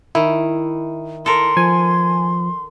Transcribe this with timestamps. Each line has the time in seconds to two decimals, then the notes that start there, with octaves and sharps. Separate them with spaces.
0.15 D#3 E4
1.26 A4 A#4 C6
1.57 F3 G#5